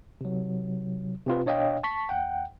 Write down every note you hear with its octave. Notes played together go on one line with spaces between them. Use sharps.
C3 F#3
C3 C4 F4 B4
B2 D4 C#5 D#5 F5 G5
A5 C#6 B6
D#2 F#5 G5